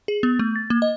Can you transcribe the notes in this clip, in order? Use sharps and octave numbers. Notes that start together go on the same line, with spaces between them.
G#4
B3
A3
A6
A#3
D#5